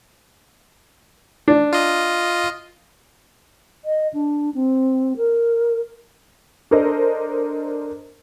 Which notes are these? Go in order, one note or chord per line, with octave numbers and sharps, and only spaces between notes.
D4
F4 D#5
D#5
D4
C4
A#4
D4 A4 A#4 C5 D#5